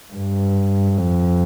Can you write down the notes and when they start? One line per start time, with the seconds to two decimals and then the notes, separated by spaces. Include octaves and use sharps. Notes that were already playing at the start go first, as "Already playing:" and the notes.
0.13 G2
0.97 F2